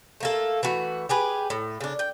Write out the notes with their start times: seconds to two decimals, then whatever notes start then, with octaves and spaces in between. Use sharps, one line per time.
0.20 A3 A#3 A4
0.63 E3 A3 F#4
1.09 G4 G#4 B4
1.50 A2
1.81 C#3 D4
1.99 G5